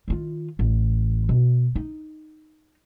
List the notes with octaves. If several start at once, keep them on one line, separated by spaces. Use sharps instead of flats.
D#3 F4
A1
B2
D#4